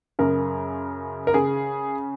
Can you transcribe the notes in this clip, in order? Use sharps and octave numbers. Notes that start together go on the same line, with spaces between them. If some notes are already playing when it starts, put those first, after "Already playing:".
F#2 C#3 A#4
A#4
C#3 G#4